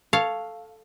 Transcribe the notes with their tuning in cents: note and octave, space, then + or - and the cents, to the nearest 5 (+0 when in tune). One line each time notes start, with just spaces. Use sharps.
A4 +0 C#5 +0 F5 +0